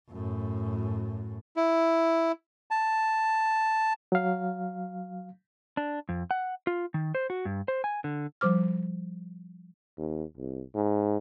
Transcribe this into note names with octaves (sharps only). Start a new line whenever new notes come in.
F#2 A2
E4
A5
F#3 F5
D4
F2
F#5
F4
D#3
C5
F#4
G2
C5
G#5
D3
F3 G3 C5 D6 F6
D#2
C2
G#2